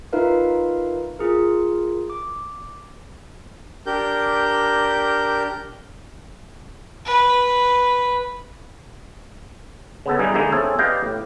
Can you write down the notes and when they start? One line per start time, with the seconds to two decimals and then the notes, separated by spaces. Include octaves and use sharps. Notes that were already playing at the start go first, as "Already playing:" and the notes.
0.13 D#4 F4 A#4 B4 E5 F5
1.19 F4 G#4 A#4
2.10 D6
3.86 D4 G4 A#4 G6
7.06 B4
10.06 C#3 B3 A4
10.19 G2 G3 D#4 E4 G#4
10.34 D3 G#3 A#3 D#4 E4 G#4
10.52 C4 C#4 E4 G#4 A4
10.79 G4 B4 D5 D#5 F5 G5
11.04 A2